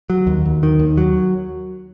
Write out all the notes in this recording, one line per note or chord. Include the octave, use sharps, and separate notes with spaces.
F#3
D#2
D#2
D#3
D#2
F#3